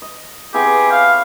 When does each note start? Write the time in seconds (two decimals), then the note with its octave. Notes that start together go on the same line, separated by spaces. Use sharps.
0.02 D#5
0.54 B3 C4 E4 G4 G#4
0.91 C#5 F5